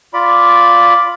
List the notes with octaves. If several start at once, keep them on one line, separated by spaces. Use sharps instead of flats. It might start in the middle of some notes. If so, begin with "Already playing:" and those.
F4 D5 B5